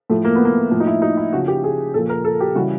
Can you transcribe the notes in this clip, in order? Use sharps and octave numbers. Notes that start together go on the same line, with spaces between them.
A2 F3 A3
A#3
B3
A#3
A2 F3 A#3
D#4
E4
D#4
E4
C#3 F3 F#4
G4
G#4
A#2 F3 A4
A#4
A4
G4
C#3 E3 G3 F#4